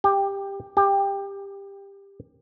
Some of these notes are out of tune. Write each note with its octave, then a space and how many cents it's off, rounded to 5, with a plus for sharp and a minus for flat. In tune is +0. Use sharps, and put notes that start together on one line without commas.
G4 +15
G4 +20